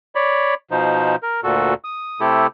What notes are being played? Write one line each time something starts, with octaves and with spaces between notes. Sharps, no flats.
C#5 D5 B5
B2 F3 D#4 C5
A#4
D2 A#2 F#4 A4
D#6
C3 A3 E4 G4 A4